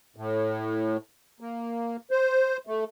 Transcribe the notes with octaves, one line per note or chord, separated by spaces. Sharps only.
A2
A#3
C5
A3